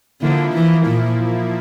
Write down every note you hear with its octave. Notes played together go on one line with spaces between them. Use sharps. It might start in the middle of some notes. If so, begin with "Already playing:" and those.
D3 F3 A#3 E4
E3
A#2